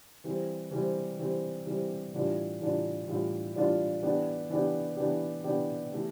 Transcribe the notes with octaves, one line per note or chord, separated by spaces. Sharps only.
E3 G3 C4
E3 G3 C4
E3 G3 C4
E3 G3 C4
A2 E3 G3 D4 F4
A2 E3 G3 D4 F4
A2 E3 G3 D4 F4
A2 E3 G3 D4 F4
E3 B3 D4 G4
E3 B3 D4 G4
E3 B3 D4 G4
E3 B3 D4 G4
E3 A3 E4 G4